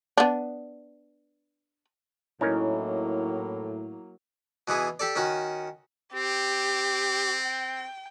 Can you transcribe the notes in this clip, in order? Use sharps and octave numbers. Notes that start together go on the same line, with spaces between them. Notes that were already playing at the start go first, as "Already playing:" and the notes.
B3 D4
A2 F#3 A#3 C#4 D#4 E4 A#4
B2 E3 B3 G#4
G4 A4 D5
D#3 C#4 F#4
C4 G4
G5